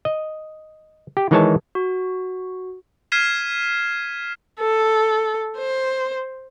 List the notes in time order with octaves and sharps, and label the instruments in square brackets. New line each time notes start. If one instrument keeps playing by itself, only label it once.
[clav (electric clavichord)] D#5
G4
D#3 E3 G#3 C#5 G#5 A5
[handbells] F#4
[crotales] F6 G#6 B6 C7 D#7 E7
[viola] A4
C5